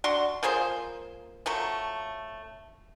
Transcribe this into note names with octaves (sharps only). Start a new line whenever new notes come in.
D4 F#4 C6
F3 A#3 G#4 C5
F3 F#3 A3